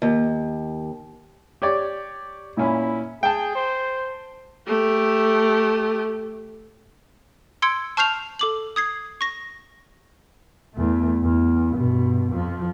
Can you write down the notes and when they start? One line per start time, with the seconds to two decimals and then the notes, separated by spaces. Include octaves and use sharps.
0.02 D#2
1.62 G4 C#5 D5
2.57 A#2 C#4 E4 B5
3.23 G#4 G5 A5
3.55 C5
4.67 A3 G4
7.62 C6 E6 G#6 C#7 D7
7.97 A5 C#6 F6 G6 C7 F7
8.39 A4 D6 F#7
8.76 D#6 G#6 C7
9.21 C#6 A#6
10.74 E2 A3
11.22 E2
11.75 G2 B2
12.31 F2 F3